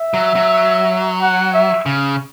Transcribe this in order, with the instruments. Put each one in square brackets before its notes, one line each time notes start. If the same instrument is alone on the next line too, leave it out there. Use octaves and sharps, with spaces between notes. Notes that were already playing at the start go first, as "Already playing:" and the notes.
Already playing: [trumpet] E5
[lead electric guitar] F#3
F#3
[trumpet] F#5
E5
[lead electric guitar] C#3